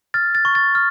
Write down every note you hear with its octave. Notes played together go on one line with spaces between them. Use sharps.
F6 A6
A6
C#6
A6
F6